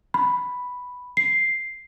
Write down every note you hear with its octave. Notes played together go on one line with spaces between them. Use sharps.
B5
C7